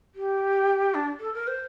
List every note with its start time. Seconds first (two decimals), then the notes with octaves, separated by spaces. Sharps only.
0.15 G4
0.94 D4
1.20 A4
1.34 A#4
1.47 C5